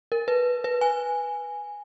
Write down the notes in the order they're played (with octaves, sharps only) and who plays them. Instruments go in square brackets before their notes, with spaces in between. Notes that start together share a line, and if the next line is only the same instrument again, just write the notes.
[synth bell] A#4
B4
B4
G#5